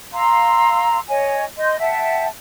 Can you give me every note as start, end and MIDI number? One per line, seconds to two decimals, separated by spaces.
0.13 0.99 77
0.13 0.99 82
0.13 0.99 84
0.13 0.99 88
1.09 1.45 73
1.09 1.45 75
1.09 1.45 80
1.58 1.78 75
1.58 1.78 84
1.58 1.78 91
1.80 2.27 76
1.80 2.27 78
1.80 2.27 79
1.80 2.27 81